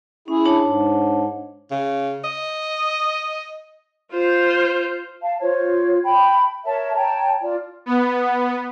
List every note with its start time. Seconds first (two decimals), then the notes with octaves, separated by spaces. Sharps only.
0.28 C#4 E4 G#4
0.45 D4 C#5 A5
0.63 G#2
1.71 C#3
2.24 D#5
4.12 F4 C5
5.22 F5 A5
5.40 F4 C5 C#5
6.03 G5 A5 B5
6.64 A#4 C#5 E5 A5
6.94 C#5 G5 A5 A#5
7.41 F4 D5
7.86 B3